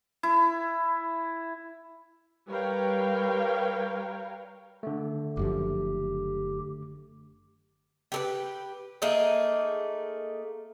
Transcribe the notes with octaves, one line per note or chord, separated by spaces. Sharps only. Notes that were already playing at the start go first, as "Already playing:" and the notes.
E4
G3 A#4 B4 C#5 F5 G5
D3 A3
F#1 F#2 F3 G4
G4 A4 B4
A3 A#3 D#4 G#4